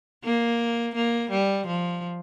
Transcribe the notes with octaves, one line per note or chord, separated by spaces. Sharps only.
A#3
A#3
G3
F3